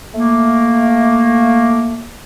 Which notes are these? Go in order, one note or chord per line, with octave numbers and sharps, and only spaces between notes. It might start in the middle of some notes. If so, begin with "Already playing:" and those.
A3 A#3